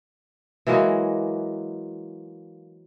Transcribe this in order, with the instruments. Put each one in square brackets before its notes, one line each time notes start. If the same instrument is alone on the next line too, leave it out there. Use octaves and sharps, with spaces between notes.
[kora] E3 F#3 G#3 A#3